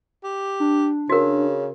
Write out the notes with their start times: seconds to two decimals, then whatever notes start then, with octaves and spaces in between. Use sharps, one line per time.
0.24 G4
0.60 D4
1.09 C#3 F#4 A#4